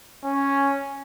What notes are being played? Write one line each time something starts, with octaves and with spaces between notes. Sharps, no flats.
C#4